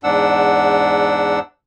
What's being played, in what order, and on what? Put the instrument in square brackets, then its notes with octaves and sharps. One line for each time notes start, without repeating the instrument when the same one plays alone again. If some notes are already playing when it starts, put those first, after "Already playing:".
[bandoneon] E2 G#2 D4 F#5 E6